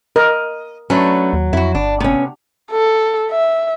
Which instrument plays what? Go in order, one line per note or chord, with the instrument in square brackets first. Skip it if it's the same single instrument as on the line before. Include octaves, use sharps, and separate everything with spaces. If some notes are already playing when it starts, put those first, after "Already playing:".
[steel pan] A#4 [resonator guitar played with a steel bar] D#5
[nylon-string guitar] F#3 [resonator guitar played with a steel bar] A3 D4 B4 [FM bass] C#4
[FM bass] D#2
[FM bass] F2 [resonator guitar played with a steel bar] E4 F#4
[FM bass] G1 [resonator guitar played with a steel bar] D4
[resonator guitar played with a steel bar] C3 [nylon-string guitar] B3 C#4
[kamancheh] A4
E5